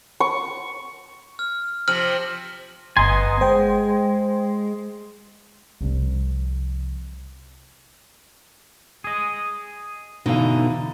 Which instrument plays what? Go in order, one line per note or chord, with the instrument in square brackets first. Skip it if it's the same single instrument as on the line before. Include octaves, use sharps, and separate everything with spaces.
[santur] C#6
[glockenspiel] F6
[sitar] C3 F3 [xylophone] F6 [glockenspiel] F#7
[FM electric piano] G1 A#5 C6 [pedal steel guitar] B3 D#5 G#5
[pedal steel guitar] G#3 [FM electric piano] C5 G5
[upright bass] C2 F3
[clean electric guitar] G#4 D#5
[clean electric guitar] B2 D3 E3 [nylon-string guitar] D#4 F5